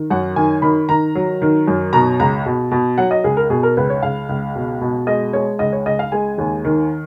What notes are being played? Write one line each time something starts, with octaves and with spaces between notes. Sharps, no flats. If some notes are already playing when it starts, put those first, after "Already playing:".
Already playing: D#3
F#2 F#5
D#3 G#5
D#3 B5
D#3 A#5
F#3
D#3
F#2
B2 A#5
C#2 A#5
B2
B2
F#3 F#5
D#5
C#2 G#4
A#4
B2 G#4
A#4
C#2 B4
C#5
C#2 F5
C#2
B2
B2
G#3 D#5
G#3 C#5
C#2 D#5
C#5
C#2 D#5
F5
G#3 G#5
D#2
D#3